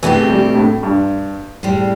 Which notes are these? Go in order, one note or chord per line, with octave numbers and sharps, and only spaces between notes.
B2 E3 A3 C4 G4
G3
A2
G2
A2 G3 C4